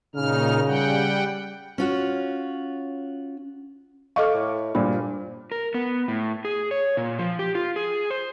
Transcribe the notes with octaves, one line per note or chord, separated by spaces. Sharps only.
A#2 C#3 D#4 F6
G3 F#5 G5
C#4 F4 F#4
A4 D#5 F5 C#6 D6 F6
A2
G2 A#2 F3 B5
A#4
B3
A2
G#4
C#5
A#2
F3
G4
F4
G#4
C5